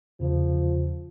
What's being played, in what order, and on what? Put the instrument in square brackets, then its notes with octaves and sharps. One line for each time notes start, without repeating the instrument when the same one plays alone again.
[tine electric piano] E2 C#3 [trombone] F3